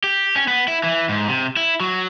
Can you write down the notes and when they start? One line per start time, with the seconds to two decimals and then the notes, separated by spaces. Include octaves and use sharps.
0.04 G4
0.36 C#4
0.48 B3
0.68 E4
0.84 E3
1.09 G#2
1.29 C3
1.56 E4
1.80 F#3